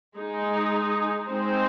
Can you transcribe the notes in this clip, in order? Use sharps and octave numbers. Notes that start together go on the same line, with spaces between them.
G#3 D#4 G#4
G#3 C4 D#4 G#4 C5